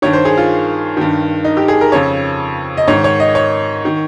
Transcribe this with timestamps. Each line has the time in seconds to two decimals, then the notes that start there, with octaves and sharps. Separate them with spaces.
0.02 G2 D#3 C#5
0.13 C5
0.25 G#4
0.38 F4
0.97 G2 D#3
1.44 D#4
1.57 G4
1.68 G#4
1.81 A#4
1.92 F2 C#3 C#5
2.77 D#5
2.88 G#2 D#3 C#5
3.04 C#5
3.20 D#5
3.35 C#5
3.85 D#3